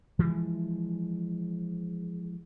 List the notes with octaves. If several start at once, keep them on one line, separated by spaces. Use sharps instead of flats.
E3 F3 G#3